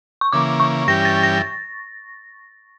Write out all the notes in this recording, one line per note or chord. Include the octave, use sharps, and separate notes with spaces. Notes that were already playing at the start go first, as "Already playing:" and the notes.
C#6
C#3 E3 A#3 D6
C#6
G2 E3 G3 C#4 G4 A#6
A6
A#6